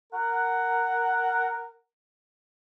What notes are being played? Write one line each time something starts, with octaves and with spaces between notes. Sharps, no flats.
A#4 F#5